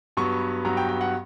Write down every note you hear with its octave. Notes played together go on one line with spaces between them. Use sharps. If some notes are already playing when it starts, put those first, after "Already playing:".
G2 F#3 B3 C#6
G2 F#3 B3 A#5
G5
G5
F#5